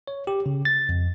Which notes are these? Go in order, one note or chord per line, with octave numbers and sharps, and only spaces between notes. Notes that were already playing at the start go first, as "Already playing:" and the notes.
C#5
G4
C#3
A6
F2